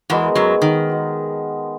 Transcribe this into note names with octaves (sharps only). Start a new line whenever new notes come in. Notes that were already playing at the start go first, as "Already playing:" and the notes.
E2 E3 G#3 B3 F#4 A#4
F#2 F#3
D#3
G#3 B3 F#4 A#4